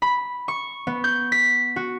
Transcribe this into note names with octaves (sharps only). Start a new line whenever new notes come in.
B5
C#6
B3
G6
B6
F#4